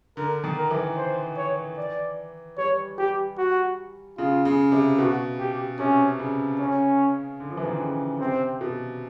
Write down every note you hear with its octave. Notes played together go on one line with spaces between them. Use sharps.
D3 A#4
D#3
A#4
E3
C5
C#5
D5
G3 C#5
G3 G4
F#4
C#3 F4
C#3
C3
B2 F#4
G4
C3 C#4
C#3
C#4
D3
F3
E3
D#3
D3
C#3
C3 C4
B2